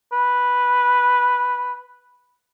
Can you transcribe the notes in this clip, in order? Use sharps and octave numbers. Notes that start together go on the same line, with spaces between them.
B4